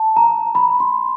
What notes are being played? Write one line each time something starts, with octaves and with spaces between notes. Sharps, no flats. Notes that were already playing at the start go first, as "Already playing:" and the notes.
Already playing: A5
A#5
B5
C6